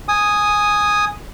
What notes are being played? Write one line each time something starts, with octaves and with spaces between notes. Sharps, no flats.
G#5 D#6